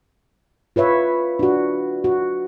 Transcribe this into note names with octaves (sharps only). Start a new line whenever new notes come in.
F4 B4 C#5 E5
D4 F#4
F#4